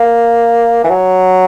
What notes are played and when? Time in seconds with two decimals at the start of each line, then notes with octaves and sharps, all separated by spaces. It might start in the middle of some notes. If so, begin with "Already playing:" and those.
Already playing: A#3
0.84 E3
0.90 F#3